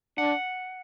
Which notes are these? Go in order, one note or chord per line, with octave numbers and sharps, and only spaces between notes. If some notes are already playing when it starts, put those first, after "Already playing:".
D4 F#5